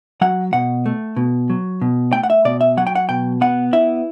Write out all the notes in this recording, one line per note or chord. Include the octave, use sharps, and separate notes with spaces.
F#3 F#5
B2 F#5
A3
B2
F#3
B2
A3 G5
F#5
E5
B2 D5
E5
F#3 F#5
G5
F#5
B2 G5
B3 F#5
E4 E5